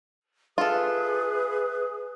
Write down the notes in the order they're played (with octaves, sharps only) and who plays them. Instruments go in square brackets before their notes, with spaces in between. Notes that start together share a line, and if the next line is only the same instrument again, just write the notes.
[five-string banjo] F4 A4 [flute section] G#4 E5 D#6 [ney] B4